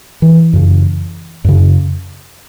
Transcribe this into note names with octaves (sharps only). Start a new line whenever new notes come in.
E3
F#2 C#3
F#2 C#3